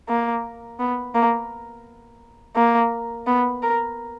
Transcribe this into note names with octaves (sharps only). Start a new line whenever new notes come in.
A#3
B3
A#3
A#3
B3
A#4